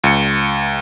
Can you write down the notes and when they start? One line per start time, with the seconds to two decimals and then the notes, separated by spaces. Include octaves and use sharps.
0.04 C#2 C#7